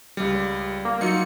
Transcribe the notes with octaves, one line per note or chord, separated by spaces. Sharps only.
C#2 G3
A#3
F#3 D#4 F4 C#7